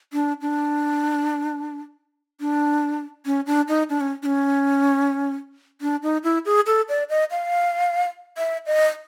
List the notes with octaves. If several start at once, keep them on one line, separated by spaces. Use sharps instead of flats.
D4
D4
D4
C#4
D4
D#4
D4
C#4
D4
C#4
D4
D#4
E4
G#4
A4
D5
D#5
F5
E5
D#5